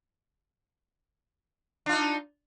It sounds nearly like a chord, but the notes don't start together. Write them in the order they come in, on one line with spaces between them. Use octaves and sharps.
D4 F4 D#4